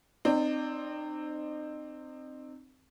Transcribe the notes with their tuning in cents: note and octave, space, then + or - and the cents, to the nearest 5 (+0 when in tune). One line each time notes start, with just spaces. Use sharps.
C4 +0 D#4 -35 D5 -10